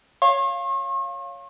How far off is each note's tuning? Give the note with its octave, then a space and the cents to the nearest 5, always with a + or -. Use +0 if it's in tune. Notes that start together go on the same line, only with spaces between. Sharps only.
C#5 +0 F5 +0 C#6 -45